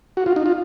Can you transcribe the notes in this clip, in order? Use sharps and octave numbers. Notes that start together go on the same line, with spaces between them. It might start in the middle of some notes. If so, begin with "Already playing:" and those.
F#4
F4
D#4
F4